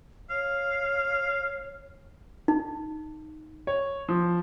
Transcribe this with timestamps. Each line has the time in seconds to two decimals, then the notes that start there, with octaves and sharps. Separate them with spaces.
0.30 C#5 F5
2.48 D#4
3.67 C#5
4.09 F3